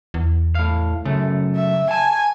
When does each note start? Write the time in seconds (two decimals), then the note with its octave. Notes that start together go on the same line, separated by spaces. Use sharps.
0.14 E2
0.55 A2 F5
1.06 F#2 C#3 A3
1.56 E5
1.91 G#5 A5